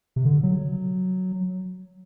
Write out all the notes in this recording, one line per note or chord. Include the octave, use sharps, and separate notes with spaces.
C3
D3
F#3